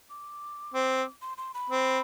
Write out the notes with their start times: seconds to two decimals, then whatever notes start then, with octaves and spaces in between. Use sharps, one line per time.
0.10 D6
0.74 C4
1.22 C6
1.37 C6
1.54 B5
1.70 C4